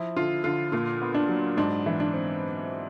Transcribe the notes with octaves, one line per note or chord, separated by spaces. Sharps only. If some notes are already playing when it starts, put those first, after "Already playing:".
Already playing: F3 E4
D3 F4
D3 F4
A#2 F4
B3
D4
F#3
G#2 D4
E3
D4
C4